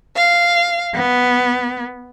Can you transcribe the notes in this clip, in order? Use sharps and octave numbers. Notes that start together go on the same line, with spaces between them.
F5
B3